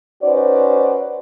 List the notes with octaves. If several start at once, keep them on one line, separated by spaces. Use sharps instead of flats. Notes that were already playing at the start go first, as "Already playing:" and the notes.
C#4 D#4 F#4 B4 C5 D5